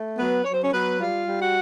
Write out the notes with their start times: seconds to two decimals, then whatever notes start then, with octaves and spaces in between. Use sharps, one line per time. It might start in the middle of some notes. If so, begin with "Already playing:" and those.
Already playing: A3
0.17 F#3 B3 B4
0.45 F#3 C#5
0.53 C5
0.61 C#4 C#5
0.72 F#3 B3 B4
0.99 G3 F4 F5
1.27 G3
1.40 F#4 F#5